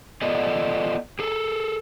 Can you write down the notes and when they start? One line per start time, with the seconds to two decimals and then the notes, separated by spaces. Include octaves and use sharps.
0.22 B3 F4 A4 D5 D#5
1.19 G#4 A4